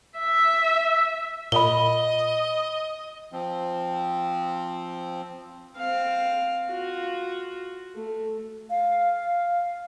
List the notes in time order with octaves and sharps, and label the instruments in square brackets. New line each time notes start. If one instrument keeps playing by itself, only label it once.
[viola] E5
[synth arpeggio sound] A#2 [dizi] D#5 [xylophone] B5 G7
[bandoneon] F3 C4
[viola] C4 F5
F4 F#4
A3
[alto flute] F5